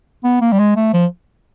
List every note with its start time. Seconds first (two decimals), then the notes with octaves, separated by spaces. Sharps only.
0.24 B3
0.41 A#3
0.52 G3
0.59 G#3
0.76 A3
0.93 F3